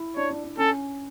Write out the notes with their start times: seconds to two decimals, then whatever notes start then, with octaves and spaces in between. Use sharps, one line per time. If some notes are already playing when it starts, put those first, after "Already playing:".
Already playing: E4
0.17 D4 C#5
0.30 D4
0.44 D4
0.57 C#4 A4